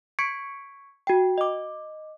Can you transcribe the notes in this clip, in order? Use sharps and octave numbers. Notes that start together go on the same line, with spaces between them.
C#6 G#6 B6 C#7 D7
F#4 G5
D#5 D6